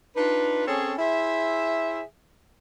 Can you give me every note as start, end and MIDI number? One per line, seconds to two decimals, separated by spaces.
0.16 0.64 62
0.16 0.64 63
0.16 0.64 65
0.16 0.64 71
0.66 0.92 60
0.66 0.92 61
0.66 0.92 68
0.66 0.92 69
0.66 0.92 72
0.66 0.92 73
0.97 2.01 64
0.97 2.01 68
0.97 2.01 72
0.97 2.01 76